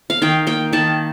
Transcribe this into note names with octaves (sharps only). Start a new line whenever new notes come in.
F5
D#3 G5
A#3 G5
D#3 A5